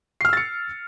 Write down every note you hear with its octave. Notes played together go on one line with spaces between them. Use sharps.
E6 F6 A6 C7 C#7